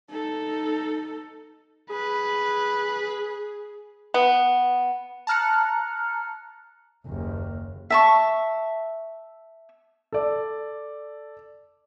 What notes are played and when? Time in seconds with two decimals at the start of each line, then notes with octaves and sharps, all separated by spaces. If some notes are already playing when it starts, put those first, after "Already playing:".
0.10 D#4 A4
1.90 G#4 B4
4.14 B3
5.27 A5 A#5 F6 F#6 C#7
7.07 F#1 D#2
7.90 E5 A5 C#6
10.12 A4 D5